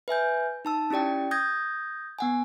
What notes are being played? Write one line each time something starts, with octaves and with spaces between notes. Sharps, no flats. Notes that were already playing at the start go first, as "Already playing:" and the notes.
B4 E5 G#5 G6
D#4 A5 E6
C#4 E4 G4 D5 G5
D#6 G6 G#6 A#6
B3 F#5 G#5